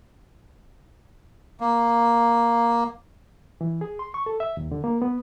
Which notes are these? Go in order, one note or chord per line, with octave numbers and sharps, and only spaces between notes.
A#3
E3
G#4
C6
C#6
A4
E5
D#2
D3
A#3
B3